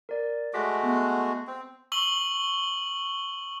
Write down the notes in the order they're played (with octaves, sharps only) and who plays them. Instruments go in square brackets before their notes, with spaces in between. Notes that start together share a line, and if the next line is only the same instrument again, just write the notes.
[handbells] A#4 D5
[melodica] G#3 A3 F#4 [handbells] D6 A#6 B6
[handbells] B3
[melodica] C4
[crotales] C#6 E6 F#7 G7